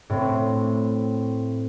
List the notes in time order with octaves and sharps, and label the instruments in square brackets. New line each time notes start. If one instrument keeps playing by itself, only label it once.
[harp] A2 C4